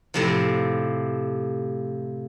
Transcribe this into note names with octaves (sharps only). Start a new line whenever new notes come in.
A2 C3 F3